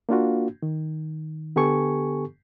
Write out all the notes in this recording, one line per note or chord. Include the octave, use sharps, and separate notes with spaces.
A#3 D4 F4 F#4
D#3
D3 B3 G4 A4 G#5 C#6